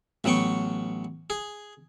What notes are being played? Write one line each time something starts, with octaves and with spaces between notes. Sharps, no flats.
A1 F#3 B3 G5 C#6
G#4